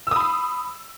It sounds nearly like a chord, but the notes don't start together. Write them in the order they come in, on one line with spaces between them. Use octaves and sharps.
E6 D#6 B5 C7